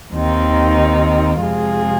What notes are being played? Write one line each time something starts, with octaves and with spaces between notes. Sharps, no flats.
D#2 D#3 C4 D#4
F2 C3 G#3 F4 G#4